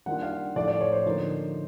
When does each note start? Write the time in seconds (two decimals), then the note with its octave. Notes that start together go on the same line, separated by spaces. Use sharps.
0.06 D#3 G3 A#3 D4 F4 F#5
0.22 F5
0.56 A2 F3 A3 D5
0.68 D5
0.81 C#5
0.92 C5
1.05 D3 F3 A#3 D#4